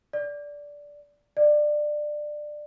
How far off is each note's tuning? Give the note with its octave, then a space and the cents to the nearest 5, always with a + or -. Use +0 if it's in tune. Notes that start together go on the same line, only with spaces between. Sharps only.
D5 -10
D5 +20